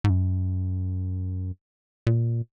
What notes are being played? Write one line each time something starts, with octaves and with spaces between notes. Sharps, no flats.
G#2
F#2
A#2